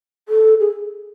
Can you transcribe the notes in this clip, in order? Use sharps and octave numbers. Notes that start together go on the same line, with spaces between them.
A4
G#4